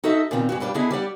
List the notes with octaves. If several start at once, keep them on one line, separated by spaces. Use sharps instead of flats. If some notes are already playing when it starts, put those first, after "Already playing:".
D#4 F#4 A4 D#5 E5
A#2 D#3 B3 C4 F4
G2 G#3 F#4
G2 G3 D4 F4 D5
D3 B3 E4 G#4 D#5
G3 G4 D5 F#5